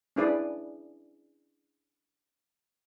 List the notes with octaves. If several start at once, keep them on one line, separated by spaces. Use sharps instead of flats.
C#4 D4 E4 G#4 B4 D5